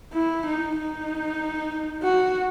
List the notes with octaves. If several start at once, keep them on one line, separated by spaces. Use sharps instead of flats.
E4
D#4
D#4
F#4